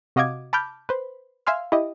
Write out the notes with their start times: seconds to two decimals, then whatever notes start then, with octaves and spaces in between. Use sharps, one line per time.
0.16 C3 F#4 D#5 F5 D6 G#6
0.53 A5 B5 D6 F6 G6
0.89 B4 C5
1.47 E5 F5 G#5 C6 F6
1.72 E4 G4 D#5